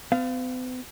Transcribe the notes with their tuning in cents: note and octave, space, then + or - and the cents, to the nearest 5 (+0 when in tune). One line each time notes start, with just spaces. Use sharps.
B3 +45 F5 -10